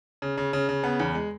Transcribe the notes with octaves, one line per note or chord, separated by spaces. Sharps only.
C#3
C#3
C#3
C#3
B3
E2
G#3